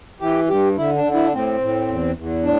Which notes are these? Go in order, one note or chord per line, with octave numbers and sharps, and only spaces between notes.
E3 G4
G2 G4
D3 E4
D4
D3
E4
D4
A2 C4
A2
E2
E2
A2 D4